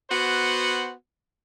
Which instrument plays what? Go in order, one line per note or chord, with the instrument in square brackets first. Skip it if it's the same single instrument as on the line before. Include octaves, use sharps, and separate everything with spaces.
[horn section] B3 F#4 C5 F#5